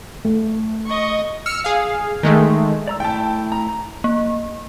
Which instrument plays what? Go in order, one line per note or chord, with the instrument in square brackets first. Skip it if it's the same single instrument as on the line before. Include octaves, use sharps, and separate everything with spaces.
[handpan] A3
[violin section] D#5 C#6
[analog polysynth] E6 F6 C#7
G#4 F5
D#3 G#3 A3
[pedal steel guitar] D5 A#5 E6
[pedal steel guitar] A3 E4 [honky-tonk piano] G5 A5
[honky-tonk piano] A#5
[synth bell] A#3